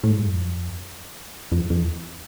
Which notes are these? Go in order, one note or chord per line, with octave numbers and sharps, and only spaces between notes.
A2
G#2
G2
F#2
F2
F2
F2
E2